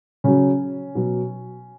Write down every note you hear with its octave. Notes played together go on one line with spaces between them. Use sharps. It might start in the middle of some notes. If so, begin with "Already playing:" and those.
C#3 F#3 C#4
B2 F#3